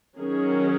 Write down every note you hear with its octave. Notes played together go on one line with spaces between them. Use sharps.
D#3 F#3 C#4 G#4